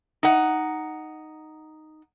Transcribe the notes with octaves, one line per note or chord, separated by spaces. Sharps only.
D#4 F#5